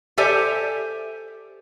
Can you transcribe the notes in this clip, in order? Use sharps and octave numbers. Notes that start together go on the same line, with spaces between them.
G4 A4 C5 D5 E5 G#5